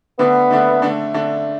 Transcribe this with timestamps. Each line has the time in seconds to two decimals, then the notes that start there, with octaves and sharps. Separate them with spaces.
0.19 D3 A3 B3 D4
0.51 D3 A3 D4
0.82 D3 A3 D4
1.14 D3 A3 D4